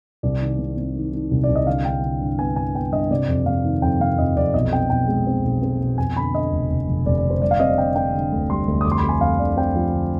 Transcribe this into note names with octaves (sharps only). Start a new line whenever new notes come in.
C2 D5
D#3
C3
C3
D#3
D#3
C2
C2 D5
D#5
D3 F5
D3 G5
D3
G2
B3 G#5
G2 G#5
B3 G5
G2 D#5
C3 D5
F2
C3 F5
D#3
F2 G5
C3 F5
F2 D#5
F2 D5
B1 D#5
C4 G5
B1 G5
G#3
C4
B1
C4
B2
F2 G#5
D3 B5
D3 D#5
F1
F1
F1
F1 D5
D5
D3
C5
G3 D5
F5
C4 D#5
D5
D3 G5
C4 G5
D3
D2
G3 C6
D2
D#6
F2 D6
C6
B5
C4
G#5
F2 F5
D3 D5
C4 G5
F3
D3